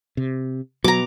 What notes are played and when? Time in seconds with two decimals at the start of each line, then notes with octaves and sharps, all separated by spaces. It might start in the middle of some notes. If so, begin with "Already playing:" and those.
0.17 C3
0.84 B2 F#3 A#5 D6